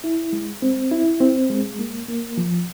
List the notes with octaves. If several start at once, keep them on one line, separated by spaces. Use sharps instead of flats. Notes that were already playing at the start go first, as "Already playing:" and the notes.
E4
G#3
C4
E4
C4
G#3
A#3
A#3
F3